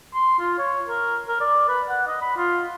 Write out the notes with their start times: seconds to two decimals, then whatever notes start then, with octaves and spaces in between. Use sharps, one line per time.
0.15 C6
0.39 F4
0.58 C#5
0.88 A#4
1.28 A#4
1.40 D5
1.68 B4
1.89 F#5
2.07 D#5
2.21 B5
2.37 F4